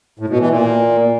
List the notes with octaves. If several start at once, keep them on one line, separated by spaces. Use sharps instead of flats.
A2
B2
E3
A#2